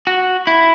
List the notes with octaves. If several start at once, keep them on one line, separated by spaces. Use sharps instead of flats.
F#4
E4